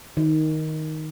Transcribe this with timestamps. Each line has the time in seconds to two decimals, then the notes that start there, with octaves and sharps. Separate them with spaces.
0.17 D#3